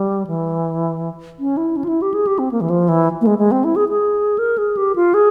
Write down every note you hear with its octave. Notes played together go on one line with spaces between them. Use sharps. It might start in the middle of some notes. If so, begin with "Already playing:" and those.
Already playing: G3
E3
C#4
E4
C#4
F4
E4
G4
G#4
G4
C4
A#3
E3
F3
E3
A#3
G#3
G#3
C4
E4
G#4
G#4
A#4
G#4
G4
F4
G#4